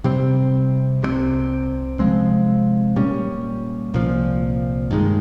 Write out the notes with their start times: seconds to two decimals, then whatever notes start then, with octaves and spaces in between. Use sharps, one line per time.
0.04 C3 G3 C4
1.02 C2 C3 G3 C4
1.99 C3 F3 G#3 C4
2.96 A#2 G3 C#4
3.94 C2 A#2 F3
4.91 G2 D#3 G#3